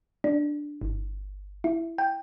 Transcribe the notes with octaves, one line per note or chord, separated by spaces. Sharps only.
D4
G1
E4
G5